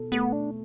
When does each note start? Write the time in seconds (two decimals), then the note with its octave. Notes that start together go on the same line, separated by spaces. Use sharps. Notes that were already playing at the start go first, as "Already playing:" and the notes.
Already playing: B2 A4
0.12 A3 B3
0.32 D4